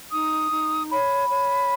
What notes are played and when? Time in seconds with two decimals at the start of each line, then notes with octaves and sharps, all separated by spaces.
0.12 D#4 D#6
0.50 D#4
0.90 C#5 B5
1.29 C#5